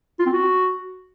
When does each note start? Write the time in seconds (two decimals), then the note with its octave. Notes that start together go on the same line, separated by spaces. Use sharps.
0.19 F4
0.26 C4
0.32 F#4